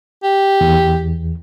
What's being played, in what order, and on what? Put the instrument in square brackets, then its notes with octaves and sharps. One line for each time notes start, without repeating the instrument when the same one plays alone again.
[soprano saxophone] G4
[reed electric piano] E2